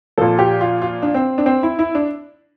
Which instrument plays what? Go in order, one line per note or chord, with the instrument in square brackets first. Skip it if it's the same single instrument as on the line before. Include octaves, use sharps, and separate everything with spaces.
[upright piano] A#2 F3 A4
G4
F4
F4
D4
C4
D4
C4
E4
E4
D4